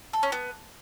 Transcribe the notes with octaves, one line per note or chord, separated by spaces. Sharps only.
A4
C#4
B3